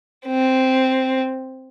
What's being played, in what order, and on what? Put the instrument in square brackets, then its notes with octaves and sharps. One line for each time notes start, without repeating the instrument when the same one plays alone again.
[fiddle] C4